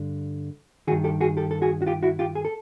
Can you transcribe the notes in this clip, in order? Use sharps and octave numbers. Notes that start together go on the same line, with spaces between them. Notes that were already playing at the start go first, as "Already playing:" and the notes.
Already playing: G2 D3
G2 D#3 F#4 G#4
G4 A4
F#4 G#4
G4 A4
A4
F#4 G#4
F#4
F4 G4
E4 F#4
F4 G4
G#4
A4